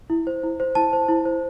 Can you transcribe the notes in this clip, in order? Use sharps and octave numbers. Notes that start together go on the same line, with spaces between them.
E4
C5
E4
C5
E4 A5
C5
E4
C5